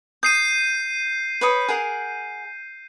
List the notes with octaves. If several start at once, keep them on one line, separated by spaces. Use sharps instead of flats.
D#6 G6 C7 D#7
B4 C#5 D#6
G#4 A#4 F#5